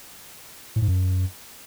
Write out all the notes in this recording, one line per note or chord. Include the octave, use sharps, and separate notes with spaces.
A2
G#2
F#2